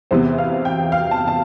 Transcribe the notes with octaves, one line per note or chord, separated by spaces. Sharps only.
E2 C3 E3 B3 C5
F5
G5
F5
A5
A5